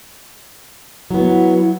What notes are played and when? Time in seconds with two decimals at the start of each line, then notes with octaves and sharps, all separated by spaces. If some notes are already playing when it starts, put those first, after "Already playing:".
1.10 F#3 B3 E4